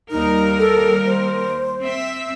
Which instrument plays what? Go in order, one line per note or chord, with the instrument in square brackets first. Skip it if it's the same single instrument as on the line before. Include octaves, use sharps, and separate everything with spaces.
[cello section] D#2 G3 A#4 [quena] D#4
[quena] A4
C5
[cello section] C4 E5